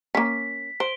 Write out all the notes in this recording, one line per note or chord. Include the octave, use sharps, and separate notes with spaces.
A#3 C#4 B6
C5 D7 G7